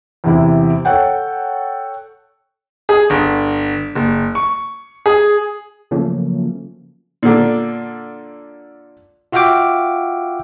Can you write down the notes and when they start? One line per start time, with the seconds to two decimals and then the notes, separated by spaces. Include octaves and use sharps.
0.24 E2 C3 E4
0.85 A4 C#5 F#5 G5
2.89 G#4
3.10 G1
3.95 F#1
4.35 C#6
5.06 G#4
5.91 C#3 F3 F#3 A3 A#3 C#4
7.23 A#2 D3
9.32 F4 F#4 E5 F5 G5 D6